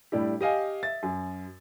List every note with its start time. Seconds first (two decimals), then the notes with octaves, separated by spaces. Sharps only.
0.12 A2 G3 D4 E4 G4
0.41 G4 D#5 F5 G#5
0.83 E5 A6
1.03 F#2